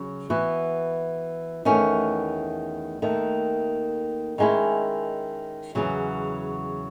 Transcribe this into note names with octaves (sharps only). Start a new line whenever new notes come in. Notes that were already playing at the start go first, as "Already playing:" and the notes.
Already playing: C#3 F#3
E3 B3 F#4
E2 D#3 A3 C#4
D#2 D#3 A3
D#3 G#3 C#4 E4
E2 C#3 F#3